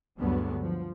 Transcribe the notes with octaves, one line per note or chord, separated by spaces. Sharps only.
D2 G2 D3 F#3 G#3 B3
F3